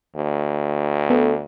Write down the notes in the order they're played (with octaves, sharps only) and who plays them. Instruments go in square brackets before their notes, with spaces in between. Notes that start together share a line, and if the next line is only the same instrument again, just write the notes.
[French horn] D2
[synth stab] B3 A4